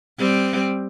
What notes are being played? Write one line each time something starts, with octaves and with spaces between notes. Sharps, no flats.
G3 C4